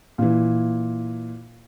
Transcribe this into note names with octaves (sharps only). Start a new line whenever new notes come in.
A#2 E3